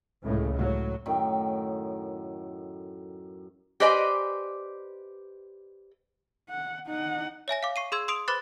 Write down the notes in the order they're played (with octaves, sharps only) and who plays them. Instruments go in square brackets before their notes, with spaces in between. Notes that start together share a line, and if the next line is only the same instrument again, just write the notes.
[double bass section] C#2 A2 C#3
A2 F#3
[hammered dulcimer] F#2 A2 D#3 G5
[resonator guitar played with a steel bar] G4 B4 C5 D5 D#5 G#5
[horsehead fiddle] F#5
D#4 F#5
[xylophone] C#5 E5 G#5 A#6
F5 D6
C#6 C7 D#7
G#4 C6 E6 G#6
C6 D#6 D7 F7
B4 C5 B5 D6 F#6 A6